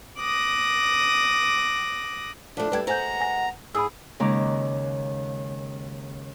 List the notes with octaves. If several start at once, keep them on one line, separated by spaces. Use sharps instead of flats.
D6 D#6 F#6 A#6
F3 A3 D4
G3 A3 B4 G5 G#6
G#3 B3 F#4 C5 G#5 A#5 G6
G#5 A#6
G#2 G#4 B5 D#6 E6
D#2 C#3 G#3 A#5 D6